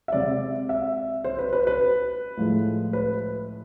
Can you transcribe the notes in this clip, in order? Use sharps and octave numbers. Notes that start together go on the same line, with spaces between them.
E5
C3 G#3 D5
E5
C5
B4
B4
B4
A2 F3 G#3
B4